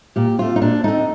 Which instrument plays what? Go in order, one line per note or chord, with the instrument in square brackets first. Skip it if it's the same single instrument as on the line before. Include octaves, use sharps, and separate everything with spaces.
[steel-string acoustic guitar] A#2 G4
A3 C4 F4
D#4
A#2 D4
A3 C4 D#4